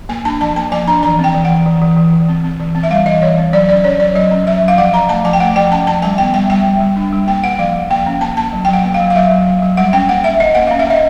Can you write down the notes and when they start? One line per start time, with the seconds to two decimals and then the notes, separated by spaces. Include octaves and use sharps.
0.09 A#3 G#5
0.25 D4 A5
0.41 F3 A5
0.56 A#3 A5
0.72 F3 G#5
0.88 D4 A#5
1.03 E3 A#5
1.19 C4
1.24 G5
1.34 E3
1.45 F#5
1.50 E3
1.66 E3
1.81 E3
1.97 E3
2.13 E3
2.28 C4
2.44 C4
2.60 E3
2.75 C4
2.83 E5
2.91 G3 F5
3.06 E3 D#5
3.22 E3 C#5
3.37 C4
3.53 F#3 D5
3.69 C#4 D5
3.84 C#4 C#5
3.99 F#3 D5
4.15 F#3 D#5
4.31 C#4
4.47 F#3 E5
4.63 F#3
4.68 F5
4.78 F3 F#5
4.93 F3 A#5
5.09 A3 A5
5.25 F3 G#5
5.33 G5
5.40 A3 F#5
5.56 F3 G5
5.71 C#4 A5
5.87 F3 A5
6.02 G3 G#5
6.18 B3 G5
6.34 G3 G5
6.50 G3 G5
6.66 G3
6.81 G3
6.97 D4
7.12 G3
7.27 A#3 G5
7.44 A#3 F#5
7.59 F3 F5
7.75 F3
7.91 A#3 G5
8.06 C#4
8.21 A#3 A5
8.37 A#3 A5
8.53 F#3
8.65 G5
8.68 F#3 F#5
8.84 A#3
8.94 F5
9.00 F#3
9.10 F5
9.15 F#3 E5
9.31 F#3
9.46 F#3
9.62 F#3
9.77 G3 F#5
9.93 C#4 G5
10.09 A#3 F#5
10.24 C#4 E5
10.40 C#4 D#5
10.55 A#3 F#5
10.67 C#4 F5
10.79 E5
10.87 C#4 D#5